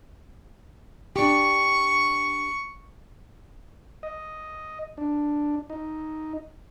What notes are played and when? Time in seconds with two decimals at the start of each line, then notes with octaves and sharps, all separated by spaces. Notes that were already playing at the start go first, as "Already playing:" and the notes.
1.16 D4 G4 C#6
4.03 D#5
4.97 D4
5.70 D#4